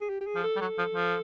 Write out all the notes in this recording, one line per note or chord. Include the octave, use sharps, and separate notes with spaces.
G#4
G4
G4
G#4
F3
A4
G3
F#3 A4
F3
F3